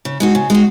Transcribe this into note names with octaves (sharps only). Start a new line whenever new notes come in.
C#3
G#3 D#4 F#4
C#3
G#3 D#4 F#4